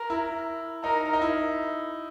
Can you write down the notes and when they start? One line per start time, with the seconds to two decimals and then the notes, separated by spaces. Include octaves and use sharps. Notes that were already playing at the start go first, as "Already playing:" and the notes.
Already playing: A#4
0.10 E4
0.84 D#4 A#4
1.13 D#4
1.22 E4